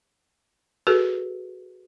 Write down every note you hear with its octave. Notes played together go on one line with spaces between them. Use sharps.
F#4 G#4 A4 B4